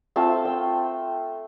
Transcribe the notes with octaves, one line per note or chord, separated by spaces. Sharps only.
A3 C4 F4 A5
G5